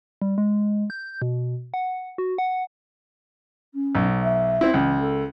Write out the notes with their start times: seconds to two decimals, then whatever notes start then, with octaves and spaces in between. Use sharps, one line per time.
0.22 G3
0.38 G#3
0.90 G6
1.22 B2
1.74 F#5
2.18 F#4
2.38 F#5
3.74 C#4
3.95 B1
4.23 E5
4.61 C4 E4
4.74 C#2 E3
5.00 A4